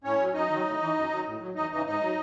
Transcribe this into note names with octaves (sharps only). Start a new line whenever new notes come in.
A2 C#4 C#5
F#3
F#2 D#4 D#5
D#3 F#3
A2
E3
F#2
D#3 F#3
A2
F#3
E2 D#4 D#5
C#3 E3 D#4 D#5
G#2 D#4 D#5
F#3